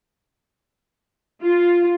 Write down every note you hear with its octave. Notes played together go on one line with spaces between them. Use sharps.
F4